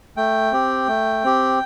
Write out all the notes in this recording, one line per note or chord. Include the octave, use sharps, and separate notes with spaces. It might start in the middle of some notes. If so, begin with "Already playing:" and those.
A3 G5
C4 G4
A3
C4 G4